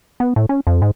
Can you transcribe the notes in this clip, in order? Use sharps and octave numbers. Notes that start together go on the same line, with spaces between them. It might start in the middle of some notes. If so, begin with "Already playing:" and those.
B3
A2
C#4
F2
G#2